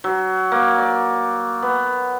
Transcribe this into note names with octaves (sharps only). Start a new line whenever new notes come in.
F#3
A#3
D5
B3